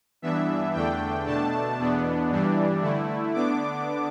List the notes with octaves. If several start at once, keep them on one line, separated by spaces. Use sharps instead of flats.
G2 E3 B3 D4 E5
E2 D3 A3 D4 G5
B2 A3 D4 A5
E2 B2 B3 D4
G2 E3 G3 D4
D3 A3 E4
D3 B3 D4 D6